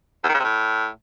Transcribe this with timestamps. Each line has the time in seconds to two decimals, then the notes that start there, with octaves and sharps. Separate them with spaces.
0.24 E2
0.29 D#3
0.34 C#3
0.39 C3
0.44 A2